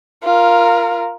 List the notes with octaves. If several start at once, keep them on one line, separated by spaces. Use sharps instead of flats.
F4 A#4